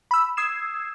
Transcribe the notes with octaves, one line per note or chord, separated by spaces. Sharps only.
B5 E6
D#6 E6 G#6 C7 E7